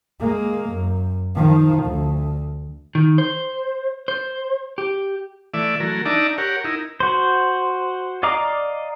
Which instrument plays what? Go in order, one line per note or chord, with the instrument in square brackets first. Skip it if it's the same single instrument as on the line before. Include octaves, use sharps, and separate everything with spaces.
[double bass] G#3 A#3
F#2
D#3 F3
D2
[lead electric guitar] D#3
C5
C5
G4
[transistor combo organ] E3 A3 D5 E5
E3 F#3 A3 A#4
D4 D#4 D5 E5 A5 A#5
G4 A#4 C#5 F#5
D#4 E4 A#4
[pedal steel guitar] F#4 C5
D5 D#5 F5 A#5 D6